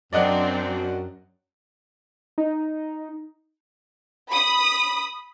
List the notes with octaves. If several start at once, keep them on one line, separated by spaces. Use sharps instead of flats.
F#2 F#3 C4 D4 D5 D#5 F#5
D#4
B5 D#6